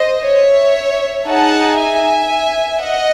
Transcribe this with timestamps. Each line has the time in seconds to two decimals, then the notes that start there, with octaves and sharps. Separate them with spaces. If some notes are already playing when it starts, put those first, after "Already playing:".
Already playing: C5 D#5
0.25 C#5 E5
1.27 D#4 G#4 F#5 A5
1.79 E5 G#5
2.81 D#5 F#5